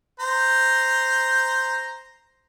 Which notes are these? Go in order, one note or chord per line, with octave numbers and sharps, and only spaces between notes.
C5 A#5